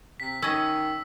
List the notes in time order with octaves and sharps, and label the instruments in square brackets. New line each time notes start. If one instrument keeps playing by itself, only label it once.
[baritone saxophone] C3 [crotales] B6
[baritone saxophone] D#3 [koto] C#4 D#5 [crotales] E6